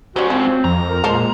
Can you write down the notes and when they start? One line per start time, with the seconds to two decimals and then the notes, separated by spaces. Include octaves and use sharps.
0.16 G#2 G3 C#4 F#4 C5
0.30 F3 C4
0.64 F2 A#5
0.89 A#4
1.04 A#2 G#3 A4 A#4 C5